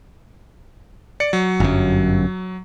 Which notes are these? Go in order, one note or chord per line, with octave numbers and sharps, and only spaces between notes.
D5 C#7
F#3
G1 F#2